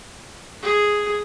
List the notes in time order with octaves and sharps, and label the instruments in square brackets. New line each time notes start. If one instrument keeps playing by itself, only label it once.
[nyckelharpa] G#4